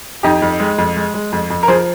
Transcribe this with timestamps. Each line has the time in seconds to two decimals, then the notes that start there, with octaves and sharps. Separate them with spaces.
0.23 F2 D#4 G4
0.42 F2
0.60 G#3
0.78 F2
0.96 G#3
1.14 G#3
1.32 F2
1.50 F2
1.63 A#4
1.68 F3 G#4 C5